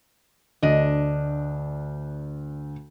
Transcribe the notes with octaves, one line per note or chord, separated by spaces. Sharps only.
D2 D4 D#5